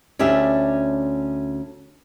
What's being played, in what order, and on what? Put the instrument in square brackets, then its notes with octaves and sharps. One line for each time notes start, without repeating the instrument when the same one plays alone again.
[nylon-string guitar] D2 C#4 D4 G4 E5